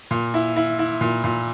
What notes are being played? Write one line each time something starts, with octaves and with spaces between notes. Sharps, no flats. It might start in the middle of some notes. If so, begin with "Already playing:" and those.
A#2
E4
E4
E4
A#2
A#2